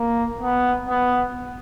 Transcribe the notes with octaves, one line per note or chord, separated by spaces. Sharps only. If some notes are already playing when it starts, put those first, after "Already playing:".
Already playing: A#3
B3
B3